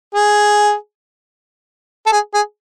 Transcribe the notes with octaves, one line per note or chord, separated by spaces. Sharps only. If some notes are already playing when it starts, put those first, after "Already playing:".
G#4
A4
G#4
G#4